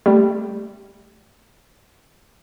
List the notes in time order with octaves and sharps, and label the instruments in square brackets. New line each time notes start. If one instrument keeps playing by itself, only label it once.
[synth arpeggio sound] G3 A3